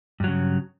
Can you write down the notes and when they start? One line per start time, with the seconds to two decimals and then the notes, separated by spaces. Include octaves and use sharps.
0.20 G2
0.24 F#3
0.28 C#3